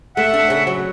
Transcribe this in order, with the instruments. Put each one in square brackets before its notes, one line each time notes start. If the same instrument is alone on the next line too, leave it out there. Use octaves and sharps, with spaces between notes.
[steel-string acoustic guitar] A3 [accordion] E5 F#5
[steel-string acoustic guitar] D4
C#3
F#3